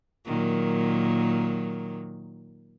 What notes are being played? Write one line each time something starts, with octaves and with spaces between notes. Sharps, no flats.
A#2 D#3 F#3